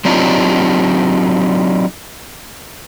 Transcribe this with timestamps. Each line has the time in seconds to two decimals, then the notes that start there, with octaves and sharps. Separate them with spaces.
0.05 F#3 C4 D4 D#4 F4 G4